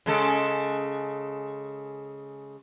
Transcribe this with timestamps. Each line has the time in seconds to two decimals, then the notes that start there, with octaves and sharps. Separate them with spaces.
0.06 C#3 G#3 A4